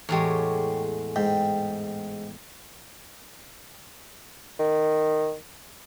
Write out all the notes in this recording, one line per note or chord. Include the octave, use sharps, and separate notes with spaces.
E2 A2 G#3 G4 C#5
G#2 G5
D#3